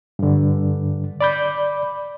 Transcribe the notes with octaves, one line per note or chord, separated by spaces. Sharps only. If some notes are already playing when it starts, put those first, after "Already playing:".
G2 D3
D5 B5 G6